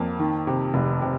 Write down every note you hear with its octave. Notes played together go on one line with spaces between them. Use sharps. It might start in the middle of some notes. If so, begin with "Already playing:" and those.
Already playing: F2 A#3
D#3
C3
F1
C3